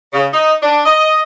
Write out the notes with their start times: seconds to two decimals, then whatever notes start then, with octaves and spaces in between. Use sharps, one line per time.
0.13 C#3
0.33 D#4
0.63 D4
0.85 D#5